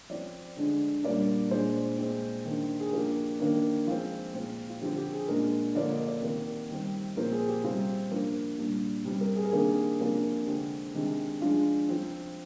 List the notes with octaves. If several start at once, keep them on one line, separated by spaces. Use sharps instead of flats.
F3 C4 D5
D3 G#3 D4
A#2 G3 A#3 D4 D5
A#2 G#3 D4 C5
A#2 G#3 C4
D#3 A#3 D4
G#4
F3 A#3 D4 G4
D#3 A#3 D4
F3 G#3 C4 F4
A#2 G#3 C4
F4
D3 F3 C4 G4
G4
G#4
A#2 G#3 D4 A#4
D3 F3 A#3 D4 D5
D#5
D5
C3 D#3 A#3 A#4
D#3 G3 C4
A#2 F3 C4 A#4
G#4
G4
C3 G3 C4 F4
F3 A#3 D4
A#2 G3 D4
C3 G3 C4
A#4
G#4
A#4
C3 D#3 A#3 D4 G#4
C3 F3 A#3 D4
D3 G#3 C4 G4
C3 D#3 G#3 D4
F3 G#3 D4 F4
F3 C4